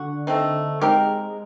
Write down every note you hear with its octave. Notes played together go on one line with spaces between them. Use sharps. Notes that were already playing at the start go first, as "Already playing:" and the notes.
Already playing: D3 F#4
A3 C4 D#4
G#3 C4 D#4 G4 A#4